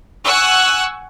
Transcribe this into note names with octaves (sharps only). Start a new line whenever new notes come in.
F#5 G#5 C#6 E6 F#6